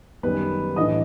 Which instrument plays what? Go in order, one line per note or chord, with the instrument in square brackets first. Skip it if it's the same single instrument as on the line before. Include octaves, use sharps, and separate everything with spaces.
[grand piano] F#2 D#3 G3 B3 D#4 B4 B5
A2 E3 A3 D4 D#5 D#6